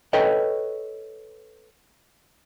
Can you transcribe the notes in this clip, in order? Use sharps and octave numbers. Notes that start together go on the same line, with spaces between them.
A4 B4 C#5 D#5 G5